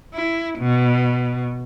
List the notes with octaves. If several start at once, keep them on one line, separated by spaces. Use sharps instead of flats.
E4
B2